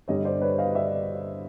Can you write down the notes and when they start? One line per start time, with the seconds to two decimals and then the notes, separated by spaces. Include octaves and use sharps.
0.08 G2 D3 G3 C#5 D#5
0.25 C5 D5
0.41 B4 C#5
0.58 D#5 F5
0.75 D5 E5